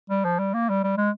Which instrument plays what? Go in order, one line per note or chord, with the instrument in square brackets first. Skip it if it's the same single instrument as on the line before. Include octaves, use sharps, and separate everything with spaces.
[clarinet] G3
F3
G3
A#3
G3
G3
G#3